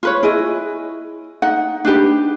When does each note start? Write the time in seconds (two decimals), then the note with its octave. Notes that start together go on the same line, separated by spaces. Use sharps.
0.03 F4 B4 C#5
0.23 E4 G#4 D#5
1.42 D#4 F#5
1.85 D4 D#4 G4 B4